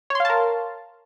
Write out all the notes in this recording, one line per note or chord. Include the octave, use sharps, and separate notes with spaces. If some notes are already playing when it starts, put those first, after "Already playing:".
A#4 C#5 F5 A5 C6